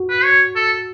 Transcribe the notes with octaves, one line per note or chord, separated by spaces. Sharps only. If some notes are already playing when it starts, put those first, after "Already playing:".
Already playing: F#4
B4
C#5
A4